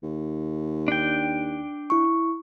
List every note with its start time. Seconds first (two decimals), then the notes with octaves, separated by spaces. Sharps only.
0.03 D#2
0.88 D4 G5
1.90 E4 C#6